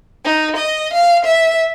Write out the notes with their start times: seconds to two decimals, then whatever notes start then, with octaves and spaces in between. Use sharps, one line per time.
0.25 D#4
0.56 D#5
0.93 F5
1.25 E5